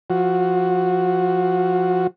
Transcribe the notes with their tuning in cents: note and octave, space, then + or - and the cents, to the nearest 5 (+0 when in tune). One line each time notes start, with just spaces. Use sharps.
F3 +0 F#4 -5